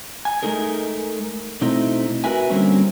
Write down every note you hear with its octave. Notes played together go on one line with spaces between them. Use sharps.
G#5
G#3 A3 D#4 G#4 A#4
B2 A3 C4 D#4 E4
F#4 A#4 B4 E5 G#5
D3 G3 A#3 C4 C#4